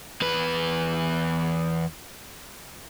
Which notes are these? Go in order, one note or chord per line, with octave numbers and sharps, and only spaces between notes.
E2 B4